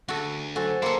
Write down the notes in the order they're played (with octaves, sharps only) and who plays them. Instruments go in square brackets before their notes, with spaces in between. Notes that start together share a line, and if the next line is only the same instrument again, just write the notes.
[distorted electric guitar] D2 [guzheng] F#4 A4
[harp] F#3 C5 G#5 [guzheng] F#4 [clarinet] A4
[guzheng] A#3 A4 [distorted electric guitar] E4 F#5 [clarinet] C6